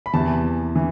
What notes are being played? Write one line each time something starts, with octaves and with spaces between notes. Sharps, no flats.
B5
E2 C3 E3 A5
E3